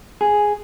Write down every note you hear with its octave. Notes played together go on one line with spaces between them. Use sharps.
G#4